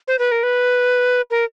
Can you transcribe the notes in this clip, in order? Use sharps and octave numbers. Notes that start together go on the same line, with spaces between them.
C5
B4
A#4
B4
A#4